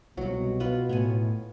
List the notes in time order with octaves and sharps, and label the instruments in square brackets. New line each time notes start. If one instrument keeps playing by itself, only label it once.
[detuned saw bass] C2 [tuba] B2 [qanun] F#3 F#4
[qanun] B3 F4 B4
[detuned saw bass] A2 [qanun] B3 C#5 G#5